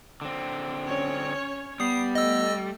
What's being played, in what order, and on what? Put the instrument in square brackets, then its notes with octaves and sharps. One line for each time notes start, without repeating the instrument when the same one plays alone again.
[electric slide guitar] D3 C4
[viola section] C#4 C#5
[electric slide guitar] G3 [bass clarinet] B3 [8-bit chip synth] D#6 C7
[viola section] A3 [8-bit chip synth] D#5 E6